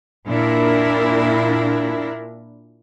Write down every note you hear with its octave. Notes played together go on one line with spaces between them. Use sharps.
A#2 D4 E4 A#4